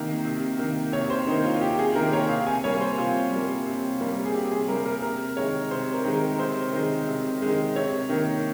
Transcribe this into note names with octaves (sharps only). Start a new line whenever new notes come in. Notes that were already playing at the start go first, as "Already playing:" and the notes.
Already playing: C3 D#3 A#3
C3
D#3 A#3
C3 C#5
C5
D#3 A#3 D#4
F4
F4
C3 G4
G#4
D#3 A#3 A#4
C#5
C3 F5
G#5
G3 A#3 C#5
C5
C3 F4
G3 A#3
C3
G3 A#3
G#4
C3 G4
G#4
G3 A#3 A#4
A#4
C3 A#4
D#3 G#3 C#5
C3 C5
A#4
D#3 G#3
A#4
C3 C5
D#3 G#3
C3
D#3 G#3
C3 C#5
D#3 A#3